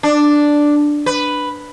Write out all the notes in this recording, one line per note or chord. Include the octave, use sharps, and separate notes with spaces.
D4
B4